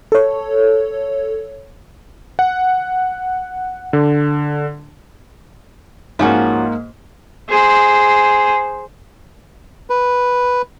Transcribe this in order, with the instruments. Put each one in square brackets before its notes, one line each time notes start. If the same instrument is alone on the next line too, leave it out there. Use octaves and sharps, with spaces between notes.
[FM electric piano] A4 C#5
[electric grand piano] F#5
D3
[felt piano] G#2 A#3 [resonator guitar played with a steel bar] F3 C#4 F#4
[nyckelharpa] G#4 C5
[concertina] B4